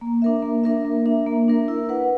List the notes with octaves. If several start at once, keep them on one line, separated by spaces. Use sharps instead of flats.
A#3
D4 A#4 E5
A#3
D4 A#4 E5
A#3
D4 A#4 E5
A#3
D4 A#4 E5
E4
B4 F#5